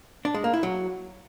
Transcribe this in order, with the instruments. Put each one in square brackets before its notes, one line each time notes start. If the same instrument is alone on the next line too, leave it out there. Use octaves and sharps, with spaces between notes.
[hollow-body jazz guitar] D4
G#3
A#3
E4
F#3